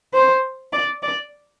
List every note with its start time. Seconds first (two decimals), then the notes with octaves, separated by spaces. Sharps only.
0.14 C5
0.73 D5
1.03 D5